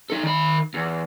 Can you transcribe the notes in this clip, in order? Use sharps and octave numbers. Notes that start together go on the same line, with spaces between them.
D#4 A4
D#3 B5
E2